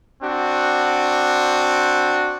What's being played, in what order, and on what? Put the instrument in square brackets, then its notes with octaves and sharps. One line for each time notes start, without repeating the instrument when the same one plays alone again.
[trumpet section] C4 D4 F#4